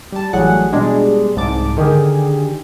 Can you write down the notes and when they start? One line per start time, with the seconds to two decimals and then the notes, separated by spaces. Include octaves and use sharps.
0.12 G3 A5
0.33 A1 F#3 G3 G#4 F#5
0.72 B2 G3 G#3 D4 G#4
1.36 C2 G#2 A5 D6
1.76 D3 D#3 G4 G#4